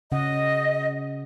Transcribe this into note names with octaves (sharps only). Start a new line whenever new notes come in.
C#3 C#4 D#5 F#5